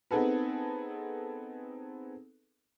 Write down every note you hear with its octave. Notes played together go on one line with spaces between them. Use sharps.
B3 C4 D#4 G#4 A4 B4